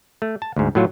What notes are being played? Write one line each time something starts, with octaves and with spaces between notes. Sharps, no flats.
A3
A5
D2 G#2
A2 F#3 F4